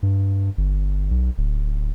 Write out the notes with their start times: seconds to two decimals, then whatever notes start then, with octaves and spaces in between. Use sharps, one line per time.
0.03 G2
0.57 G1
1.11 B1
1.37 D1